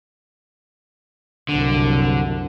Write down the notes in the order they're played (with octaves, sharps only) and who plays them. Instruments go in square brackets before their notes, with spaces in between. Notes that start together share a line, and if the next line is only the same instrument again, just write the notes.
[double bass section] C2 F#2 [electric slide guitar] D3